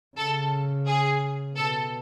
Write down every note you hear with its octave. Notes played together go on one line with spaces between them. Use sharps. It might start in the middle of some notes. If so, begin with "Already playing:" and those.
C#3 A4
G#4
B2 A4